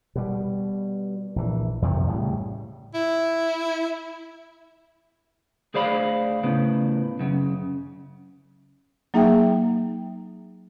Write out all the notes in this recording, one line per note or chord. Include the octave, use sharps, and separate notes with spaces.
B2 G3
A#1 E3
F2 C3 D#3 F#3
A2 C#3 G3
E4
D2 G#4 C5 D5 F5 B5
A2 C#3 B3
F#2 C#3
F#3 A#3 D#4 G#4 E5 G5